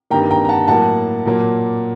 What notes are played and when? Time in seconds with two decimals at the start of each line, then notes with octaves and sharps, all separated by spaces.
0.10 G2 D#3 G3 A#3 G5 A#5
0.31 G5 A#5
0.44 A#5
0.49 F#5 A5
0.68 A2 F#3 A#3 F#5 A5
1.26 A#2 F#3 A#3